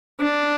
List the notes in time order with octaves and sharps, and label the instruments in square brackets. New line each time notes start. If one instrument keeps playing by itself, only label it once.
[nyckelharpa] D4